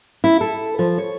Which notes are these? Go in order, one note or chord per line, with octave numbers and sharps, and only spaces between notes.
E4
A4
F3
C#5